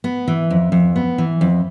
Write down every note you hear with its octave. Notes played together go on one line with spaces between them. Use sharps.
B3
E3
F2
F2
B3
E3
F2